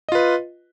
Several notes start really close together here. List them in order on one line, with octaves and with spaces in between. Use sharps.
D#5 F4 B4